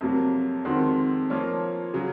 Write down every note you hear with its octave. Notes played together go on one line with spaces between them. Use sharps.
F2 C3 F#3 A#3
F2 D#3 G#3 C4 F#4
F3 A#3 F4 A#4 C#5
C#3 F#3